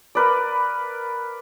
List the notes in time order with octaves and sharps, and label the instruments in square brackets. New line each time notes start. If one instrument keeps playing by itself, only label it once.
[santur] A#4 B4 D5